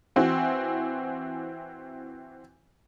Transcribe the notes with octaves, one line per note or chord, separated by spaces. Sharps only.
E3 C4 F#4